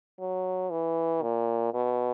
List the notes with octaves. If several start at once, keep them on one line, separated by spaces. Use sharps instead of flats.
F#3
E3
A#2
B2